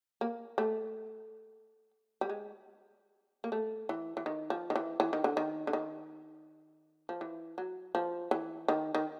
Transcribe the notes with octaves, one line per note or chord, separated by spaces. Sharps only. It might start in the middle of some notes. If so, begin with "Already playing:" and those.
A#3
A3
G3
G#3
A#3
A3
E3
E3
D#3
F3
D#3
E3
E3
D#3
D3
D#3
D3
D#3
F3
E3
F#3
F3
E3
D#3
D#3